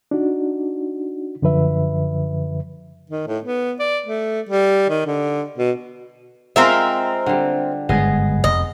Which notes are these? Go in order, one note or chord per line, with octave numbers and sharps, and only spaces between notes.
D4 D#4 F#4
F#2 D3 F3 B4 E5
D#3
A2
B3
D5
A3
G3
D#3
D3
B2
G#3 C4 F4 A#4 E5 F5
D3 G3
G1 G#2 G#3 B3 G#4 D#5
F1 D#5